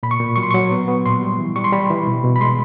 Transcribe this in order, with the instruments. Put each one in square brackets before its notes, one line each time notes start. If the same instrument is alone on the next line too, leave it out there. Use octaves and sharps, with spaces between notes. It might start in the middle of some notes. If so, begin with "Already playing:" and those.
[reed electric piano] A#2 B5
C#6
A#2
F#3 C#6
C6
F#3 C#6
B3
B3
A#2 C6
G3
E3
G3 C#6
C6
G3 B5
E3
B2
B2
B5
G#3 C6